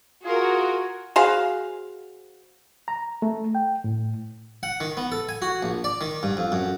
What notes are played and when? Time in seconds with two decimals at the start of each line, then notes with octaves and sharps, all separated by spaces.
0.25 F4 F#4 G#4 A#4
1.16 F#4 G#4 C5 F5
2.88 A#5
3.22 A3
3.55 G5
3.84 A2
4.63 F#5
4.80 D#3
4.97 B3
5.12 A4
5.29 G#5
5.42 F#4
5.63 A#1
5.84 D5
6.01 D#3
6.23 G2
6.37 F2
6.52 F#2